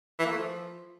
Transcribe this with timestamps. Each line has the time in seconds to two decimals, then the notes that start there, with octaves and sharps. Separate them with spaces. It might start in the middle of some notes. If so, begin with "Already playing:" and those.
0.19 E3
0.25 A#3
0.32 A3
0.38 F3